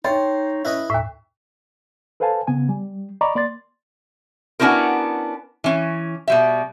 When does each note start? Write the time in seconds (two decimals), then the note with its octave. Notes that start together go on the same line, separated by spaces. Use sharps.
0.04 D#4 C5 C#5 G5 C6 A6
0.65 C#4 E4 B4 D#5
0.90 D#2 A2 E5
2.20 A4 B4 C5 F5 G#5 A5
2.47 C#3 B3 G#5
2.69 G3
3.21 D5 D#5 A#5 B5 C#6 D6
3.35 A#3 D5 C6 A6
4.60 B3 C#4 D4 E4 F#4 A#4
5.64 E3 C#4
6.28 B2 G3 E5